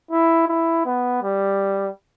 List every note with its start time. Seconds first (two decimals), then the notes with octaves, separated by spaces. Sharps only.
0.11 E4
0.48 E4
0.86 B3
1.23 G3